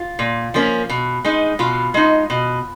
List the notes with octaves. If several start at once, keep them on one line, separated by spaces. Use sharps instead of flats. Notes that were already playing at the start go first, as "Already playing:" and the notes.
Already playing: F4
A#2
F3 A#3 C#4
B2
G#3 D#4
B2 F4
G#3 D#4
B2